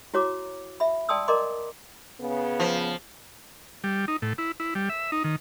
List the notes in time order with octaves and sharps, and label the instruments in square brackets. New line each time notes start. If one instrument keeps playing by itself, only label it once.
[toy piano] E4 F#4 C#5 A#5 D6
E5 B5
D5 G5 A5 C6 D#6 E6
A#4 D5 D#5 A#5 C6 D6
[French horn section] C#3 B3
[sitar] F3
[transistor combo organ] G3
D#4
A2
E4
E4
G3
E5
D#4
D#3